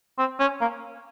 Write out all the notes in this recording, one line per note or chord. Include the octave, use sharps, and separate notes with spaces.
C4
C#4
A#3